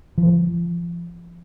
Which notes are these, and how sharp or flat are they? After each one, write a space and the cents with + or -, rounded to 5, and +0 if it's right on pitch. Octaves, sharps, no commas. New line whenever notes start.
F3 -30